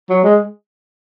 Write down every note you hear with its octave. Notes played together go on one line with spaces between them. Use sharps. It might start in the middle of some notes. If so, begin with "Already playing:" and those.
F#3
G#3